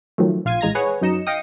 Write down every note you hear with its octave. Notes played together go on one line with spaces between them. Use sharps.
D#3 F3 F#3 A3
A#1 F4 F5 G#6 D#7
A1 A2 G#3 A#5 G#6 A#6
G#4 B4 C#5 F#5
F#2 F#3 D#4 D#5 C#7 E7
D#5 F5 G5 D#6 C#7